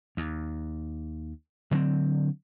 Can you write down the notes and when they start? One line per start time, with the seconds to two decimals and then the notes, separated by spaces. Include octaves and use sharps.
0.17 D#2
1.71 D3 F#3 G3 C4